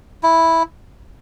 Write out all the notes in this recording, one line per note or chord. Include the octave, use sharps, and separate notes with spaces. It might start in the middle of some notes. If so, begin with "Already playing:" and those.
E4